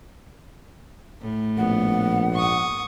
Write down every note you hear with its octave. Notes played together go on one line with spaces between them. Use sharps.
A2
A#1 B3 F#5
G#2 C#6 D#6